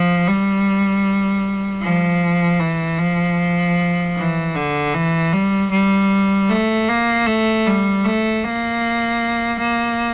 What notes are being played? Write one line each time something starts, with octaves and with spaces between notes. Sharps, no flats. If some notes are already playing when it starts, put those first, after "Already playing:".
Already playing: F3
G3
F3
E3
F3
E3
D3
E3
G3
G3
A3
A#3
A3
G3
A3
A#3
A#3